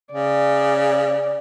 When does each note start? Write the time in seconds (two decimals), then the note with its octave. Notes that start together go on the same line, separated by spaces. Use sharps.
0.12 C#3 D5